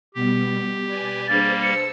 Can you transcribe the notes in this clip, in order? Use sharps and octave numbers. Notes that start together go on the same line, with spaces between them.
B2 G3 B3 G4
B4 D5 G#5
G3 A#3 D4 G#4 C5 A6
C5 A5 E6 C#7